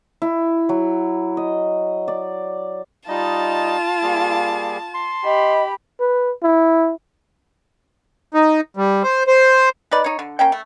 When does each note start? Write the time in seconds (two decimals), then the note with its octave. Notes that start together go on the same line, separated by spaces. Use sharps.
0.22 E4
0.69 F#3
1.37 D#5
2.08 D5
3.08 G3 D#4 F4 D#5 A5
4.03 G3 A#3 G#4
4.94 C6
5.24 G4 D#5 B5
6.00 B4
6.43 E4
8.34 D#4
8.77 G3
9.03 C5
9.27 C5
9.91 D#4 B4 D5
10.04 D#4 C#5
10.19 D3
10.39 A#3 C#4 G5
10.52 A3